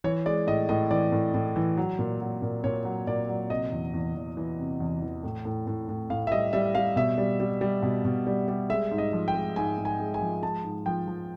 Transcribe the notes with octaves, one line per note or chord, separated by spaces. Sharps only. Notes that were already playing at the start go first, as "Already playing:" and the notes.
E3 C#5
G#3 D5
A2 D#5
A2 D#5
E3 D5
A2
A2
E3
F#3
A#2
F#3
A#2
A#2 C#5
F#3
A#2 D5
F#3
C3 D#5
E2
E2
E2
E3
C3
E2
E3
A2
A2
A2
A2
A2 F5
E5
G3 D#5
G3 E5
G3 F5
B2 E5
G3
G3
G3
B2
B2
G3
G3
G#3 E5
G#2
D#5
F3
G5
G#3
G#2 G#5
G#2
G#5
G#3
G#5
F3
G#3 A5
G#2
F3 G5
F3